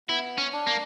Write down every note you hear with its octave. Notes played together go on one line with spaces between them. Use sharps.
B3 E4
C#4
D4
A#3